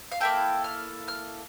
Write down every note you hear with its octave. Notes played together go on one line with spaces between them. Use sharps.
F5
A#3 E4 A4 G5
F6
F6